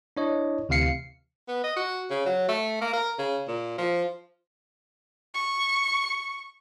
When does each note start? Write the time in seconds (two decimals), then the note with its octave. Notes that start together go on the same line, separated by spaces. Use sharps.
0.17 D4 E4 C#5 D#5
0.69 D2 C3 E3 F5 C7 C#7
1.48 B3
1.64 D#5
1.77 F#4
2.10 C#3
2.26 F#3
2.49 A3
2.82 A#3
2.94 A#4
3.19 C#3
3.48 A#2
3.78 F3
5.34 C#6